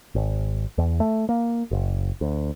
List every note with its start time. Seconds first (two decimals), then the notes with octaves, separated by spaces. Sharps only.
0.15 G#1
0.78 E2
1.00 A3
1.29 A#3
1.71 F#1
2.21 D2